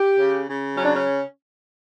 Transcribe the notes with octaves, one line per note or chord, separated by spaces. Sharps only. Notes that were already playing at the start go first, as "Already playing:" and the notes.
Already playing: G4
C#3
C#3
F#3 C#4
D4
C#4